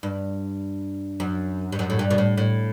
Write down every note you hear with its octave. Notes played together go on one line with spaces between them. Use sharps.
G2
F#2
G2
F#2
A2
G2
B2
A2
A2